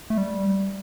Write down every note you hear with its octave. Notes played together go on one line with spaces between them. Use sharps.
A3
G3